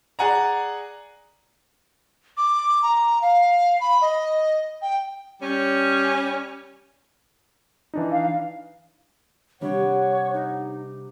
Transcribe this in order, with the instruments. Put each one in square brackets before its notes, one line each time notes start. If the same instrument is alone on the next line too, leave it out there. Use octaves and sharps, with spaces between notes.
[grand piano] G#4 D5 F#5 G#5 A#5
[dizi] D6
A#5
F5
B5
D#5
G5
[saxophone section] G3 C#4
[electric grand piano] E3 D4 D#4
[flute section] F5
[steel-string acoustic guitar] C3 G3 D4 [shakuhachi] C#5 [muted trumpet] F#5
[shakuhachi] D#4